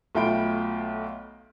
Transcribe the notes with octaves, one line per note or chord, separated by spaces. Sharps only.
B1 A3 F4 G5 B5 D7